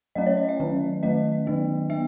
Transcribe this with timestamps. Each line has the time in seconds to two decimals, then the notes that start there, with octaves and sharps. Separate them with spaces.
0.15 F#3 A3 C#4 D#5
0.26 C#5
0.37 D#5
0.49 E5
0.60 D#3 F#3 C#4
1.03 D#3 A3 C#4 D#5
1.47 D#3 F#3 B3
1.90 B3 E5